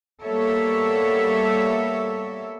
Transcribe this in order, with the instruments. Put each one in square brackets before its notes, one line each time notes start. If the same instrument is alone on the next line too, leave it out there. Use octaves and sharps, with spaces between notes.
[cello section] G3 A#3 B3 A4 C#5 E5